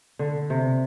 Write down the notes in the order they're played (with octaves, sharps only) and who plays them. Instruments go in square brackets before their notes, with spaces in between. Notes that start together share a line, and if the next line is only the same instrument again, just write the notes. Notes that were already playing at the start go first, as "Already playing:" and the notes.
[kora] D3
C3